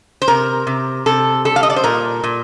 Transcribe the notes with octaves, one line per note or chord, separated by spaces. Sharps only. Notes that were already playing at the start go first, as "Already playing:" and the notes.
C5
C3 A#4
C3
C3 A4
G3 A4
F5
D#5
D5
C5
A#2 A#4
A#2